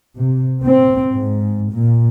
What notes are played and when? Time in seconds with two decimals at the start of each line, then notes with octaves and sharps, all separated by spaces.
0.17 C3
0.62 C4
1.15 G#2
1.71 A#2